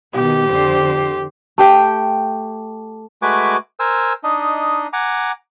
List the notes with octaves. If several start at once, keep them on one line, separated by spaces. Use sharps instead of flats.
B2 D#3 G4
F2 D3 C5
A3 G4 G5
G#3 A3 F#4 B4 G#5 D6
A#4 C5 G#5 E6
D4 D#4 D#5
F#5 G#5 A#5 D6